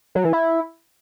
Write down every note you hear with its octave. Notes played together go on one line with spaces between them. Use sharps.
F#3
E3
E4